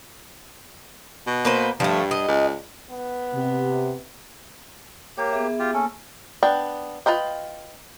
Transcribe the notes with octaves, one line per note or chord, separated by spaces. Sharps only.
B2
A#3 B4 C5
G2 F3 A3
D#5
C#2
B3
C3
A#3 G4 C#5
B3 G#4 E5
F4 G4
A#3 C#4 A4
B3 D4 G5
F4 B4 D#5 G5